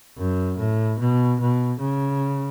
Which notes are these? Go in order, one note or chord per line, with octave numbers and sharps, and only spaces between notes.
F#2
A2
B2
B2
C#3